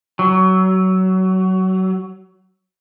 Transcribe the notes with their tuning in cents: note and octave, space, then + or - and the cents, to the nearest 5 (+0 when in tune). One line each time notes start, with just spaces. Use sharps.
F#3 +20